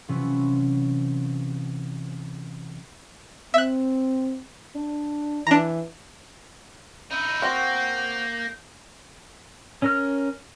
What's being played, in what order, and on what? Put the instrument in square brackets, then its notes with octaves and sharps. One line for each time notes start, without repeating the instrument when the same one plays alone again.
[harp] C3 E3 F#3 C#4 F4 B4
[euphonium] C4 [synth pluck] E5 F#6
[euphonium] D4
[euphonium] E3 [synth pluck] D4 A#5
[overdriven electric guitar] D#4 E4 [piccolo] G6
[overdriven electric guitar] A#3 [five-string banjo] C4 F#4
[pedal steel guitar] C#4 A#4 F6